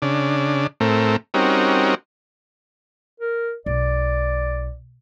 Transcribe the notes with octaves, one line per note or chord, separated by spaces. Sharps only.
C#3 D4
A2 A3 C4 A#4
G3 C4 C#4 D#4 F#4 A#4
A#4
B1 D5